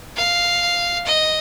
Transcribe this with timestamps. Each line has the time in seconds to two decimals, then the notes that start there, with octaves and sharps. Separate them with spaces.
0.17 F5
1.06 D#5